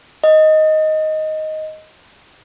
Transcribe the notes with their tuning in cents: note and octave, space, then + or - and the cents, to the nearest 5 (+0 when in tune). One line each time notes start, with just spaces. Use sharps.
D#5 +5